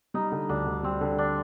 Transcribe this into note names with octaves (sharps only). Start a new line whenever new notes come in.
G3 D#4
D3
D2 D4
D2
G3 C4
D3
D4